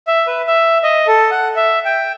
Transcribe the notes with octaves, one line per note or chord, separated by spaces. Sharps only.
E5
B4
E5
D#5
A4
F#5
E5
G5